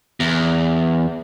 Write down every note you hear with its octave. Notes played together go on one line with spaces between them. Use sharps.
E2